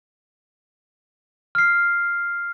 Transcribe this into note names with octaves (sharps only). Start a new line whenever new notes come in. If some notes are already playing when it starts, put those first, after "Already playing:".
F6 C7